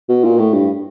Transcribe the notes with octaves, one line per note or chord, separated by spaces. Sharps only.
B2
A#2
A2
G2